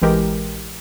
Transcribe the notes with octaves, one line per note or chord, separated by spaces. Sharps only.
A1 E3 G#3 G4 A#4